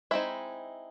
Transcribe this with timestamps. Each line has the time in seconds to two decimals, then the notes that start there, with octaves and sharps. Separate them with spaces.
0.11 G#3 C4 D#4 E4 E5